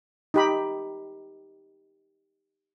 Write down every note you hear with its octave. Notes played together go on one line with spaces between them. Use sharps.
D#4 G4 B5